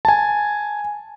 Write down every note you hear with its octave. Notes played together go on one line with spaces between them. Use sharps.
G#5 A5